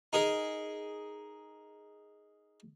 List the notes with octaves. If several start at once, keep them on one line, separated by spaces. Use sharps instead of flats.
D#4 G#4 A#4